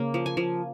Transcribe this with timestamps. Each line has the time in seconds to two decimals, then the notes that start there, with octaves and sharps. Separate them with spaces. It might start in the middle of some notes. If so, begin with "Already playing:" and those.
Already playing: C#3 A#3
0.14 F3
0.26 G#5
0.37 F3